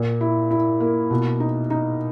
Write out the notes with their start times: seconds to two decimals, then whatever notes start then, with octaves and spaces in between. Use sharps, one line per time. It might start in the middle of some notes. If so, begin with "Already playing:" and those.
Already playing: A#2
0.21 E4
0.51 E4
0.80 A#3
1.11 B2
1.40 D#4
1.70 D#4